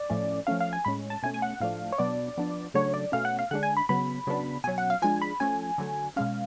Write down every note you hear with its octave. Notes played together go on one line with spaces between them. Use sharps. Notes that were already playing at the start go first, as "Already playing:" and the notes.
Already playing: D5
A2 F3 A3 C#4
F3 A3 C#4 F5
F5
G#5
A2 G#3 C#4 B5
A5
B2 A3 C#4 G#5
G#5
F#5
A2 F3 A3 D4 F5
C#5
B2 F#3 B3 D4 D5
F3 B3 D4
C#3 F#3 A3 D4 C#5
D5
B2 A3 C#4 F5
F#5
F5
D3 G#3 D4 F#5
G#5
B5
C#3 F#3 B3 B5
C#3 F#3 B3 D4
B2 F#3 C#4 G#5
F#5
F5
F3 G#3 D4 G#5
B5
F3 A3 C#4 G#5
D3 F#3 A3
B2 G#3 C#4 F5